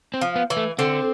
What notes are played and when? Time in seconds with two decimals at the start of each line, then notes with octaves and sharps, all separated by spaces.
0.14 C4
0.21 F3
0.36 B3
0.50 E3
0.57 A3
0.78 D3 C4